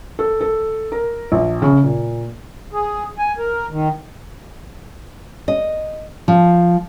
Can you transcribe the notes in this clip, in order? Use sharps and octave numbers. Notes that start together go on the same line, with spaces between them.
A4
A4
A#4
A#1
C#3
A#2
G#4
G#5
A#4
D#3
D#5
F3